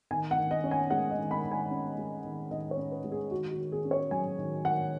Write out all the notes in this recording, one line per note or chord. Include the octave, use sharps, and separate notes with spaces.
D#3 G#5
F#5
D#3
D#5
C#4
G#5
G#3 F#5
D#5
D#3
B5
D#3
G#5
C#4
G#3
D#3
D#3 D#5
C#5
C#4
B4
G#3
G#4
D#3 F#4
F#4
D#3
G#4
C#4
C#5
F#3 G#5
D#3
D#3 F#5